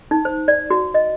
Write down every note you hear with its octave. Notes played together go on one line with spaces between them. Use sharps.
D#4
C5
D5
F#4
D#5